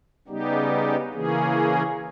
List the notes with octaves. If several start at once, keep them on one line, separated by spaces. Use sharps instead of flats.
C#3 G3 B3 D#4 G4
C#3 E3 A#3 C#4 G#4